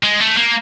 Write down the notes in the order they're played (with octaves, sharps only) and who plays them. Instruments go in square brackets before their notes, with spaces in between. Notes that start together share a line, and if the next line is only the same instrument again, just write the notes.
[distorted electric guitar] G#3
A3
A#3